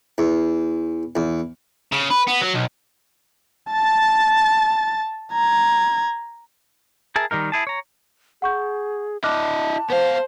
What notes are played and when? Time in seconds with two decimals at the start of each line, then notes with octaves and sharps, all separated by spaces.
0.18 E2
1.16 E2
1.92 C#3
2.10 B4
2.27 B3
2.41 F#3
2.54 B1
3.71 A5 A6
5.32 A#5 G#6
7.16 G#4 A#4 E5 A5
7.31 D#3 G3 D#4 A#4
7.52 E4 G#4 A5
7.67 C#5 A#5
8.42 G#4 F#5 C#6 G6
9.24 E4 D#5 A5 D6 F6 F#6
9.90 B3 C5 F5